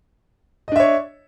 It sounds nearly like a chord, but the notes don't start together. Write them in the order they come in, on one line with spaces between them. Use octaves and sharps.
D#5 D4 E5 C#5